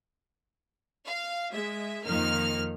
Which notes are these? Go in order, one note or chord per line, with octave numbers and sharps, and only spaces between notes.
F5
G#3 E5
F2 D#3 F3 A#3 D#4 F6